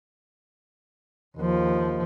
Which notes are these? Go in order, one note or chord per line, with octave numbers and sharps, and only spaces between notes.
D#2 F3